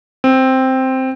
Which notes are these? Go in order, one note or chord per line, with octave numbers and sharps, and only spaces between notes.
C4